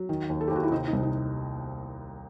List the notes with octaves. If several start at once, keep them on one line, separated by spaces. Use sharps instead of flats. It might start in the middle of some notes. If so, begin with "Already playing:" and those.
Already playing: F#3
D#3
D#2
A4
G4
D#2 F#4
E4
C3 D#4
D#4
C2
D#4